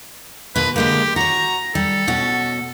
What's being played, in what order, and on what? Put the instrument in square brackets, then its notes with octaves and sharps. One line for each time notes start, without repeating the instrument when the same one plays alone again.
[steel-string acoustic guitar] B2 D#3 F4 [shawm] B4
[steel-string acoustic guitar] D3 G#3 A#3 [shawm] G4
[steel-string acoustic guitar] F#4 C#5 [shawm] A#5
[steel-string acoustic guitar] G3 [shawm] A4
[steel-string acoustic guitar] B2 C#4 F#4